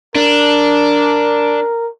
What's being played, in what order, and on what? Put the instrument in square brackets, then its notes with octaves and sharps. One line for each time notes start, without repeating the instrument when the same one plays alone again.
[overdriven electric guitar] D4 [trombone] A#4